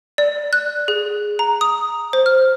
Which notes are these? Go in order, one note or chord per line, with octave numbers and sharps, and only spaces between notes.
D5
F#6
G#4
A#5
D#6
C5
F6